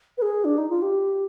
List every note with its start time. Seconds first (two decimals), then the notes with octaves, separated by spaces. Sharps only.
0.18 B4
0.22 G#4
0.45 D4
0.58 D#4
0.70 F4
0.82 G4